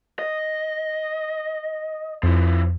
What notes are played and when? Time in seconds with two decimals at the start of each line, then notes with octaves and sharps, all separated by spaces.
0.19 D#5
2.23 F2 F3 E4